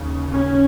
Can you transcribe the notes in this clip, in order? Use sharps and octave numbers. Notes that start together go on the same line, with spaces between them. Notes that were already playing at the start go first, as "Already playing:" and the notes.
Already playing: D#2 C#3
C#4